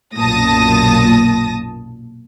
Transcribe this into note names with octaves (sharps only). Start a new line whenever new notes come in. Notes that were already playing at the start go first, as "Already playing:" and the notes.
B1 F#2 A#2 A5 D#6 A#6